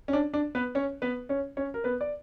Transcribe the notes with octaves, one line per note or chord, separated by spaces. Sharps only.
C#4
D4
D4
B3 B4
C#4 C#5
B3 B4
C#4 C#5
C#4 C#5
A#4
B3 B4
D5